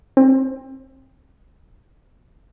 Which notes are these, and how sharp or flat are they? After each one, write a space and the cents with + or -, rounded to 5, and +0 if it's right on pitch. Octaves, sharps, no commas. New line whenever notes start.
C4 +30